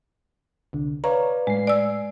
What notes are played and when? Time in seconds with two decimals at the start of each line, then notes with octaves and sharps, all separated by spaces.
0.73 C2 D3
1.04 B4 C#5 D5 F5 A#5
1.47 A2 G#3 C7
1.67 D5 G#5 E6